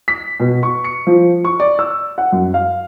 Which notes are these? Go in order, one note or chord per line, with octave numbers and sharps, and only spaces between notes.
B6
B2
C#6
C#7
F3
C#6
D5
E6
F#5
F#2
F5